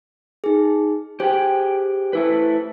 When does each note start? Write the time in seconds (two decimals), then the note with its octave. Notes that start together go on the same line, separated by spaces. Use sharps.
0.44 D#4 G#4
1.20 G4 G#4 C5 G5
2.13 A3 E4 B4